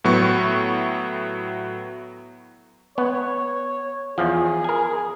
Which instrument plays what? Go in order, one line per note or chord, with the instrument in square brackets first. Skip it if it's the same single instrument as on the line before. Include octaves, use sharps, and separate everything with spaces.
[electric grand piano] A2 F#3 B3 C#6
[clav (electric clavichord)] B3 [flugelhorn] C#5
[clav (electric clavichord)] E2 F3 [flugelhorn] G#4
[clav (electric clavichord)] A#4 G#5